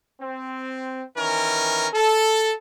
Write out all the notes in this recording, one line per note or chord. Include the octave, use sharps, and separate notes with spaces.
C4
D#3 E3 C#4 A#4
A4